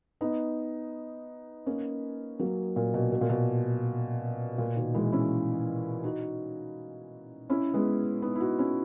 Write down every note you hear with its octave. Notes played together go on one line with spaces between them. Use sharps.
B3 D#4
A#3 C#4
F#3 A#3
A#2
B2
B2
A#2
B2
A#2
B2 D#3
E3 G#3
C#4 E4
D#4 F#4
C#4 E4
G#3 B3
B3 D#4
E4
D#4 F#4
C#4 E4